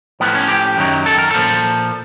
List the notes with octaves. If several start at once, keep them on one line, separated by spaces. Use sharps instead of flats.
A2 F3 B3
C#4
G4
F#2 D#3 F#3
A4
A#4
A#2 F3 A4